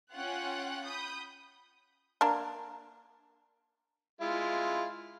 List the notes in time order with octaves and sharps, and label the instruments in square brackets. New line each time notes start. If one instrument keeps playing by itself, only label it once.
[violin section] C#4 F4 F#5 G5 F#6
B5 D#6 G6
[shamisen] A#3 D4 A#4
[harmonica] G#3 E4 F4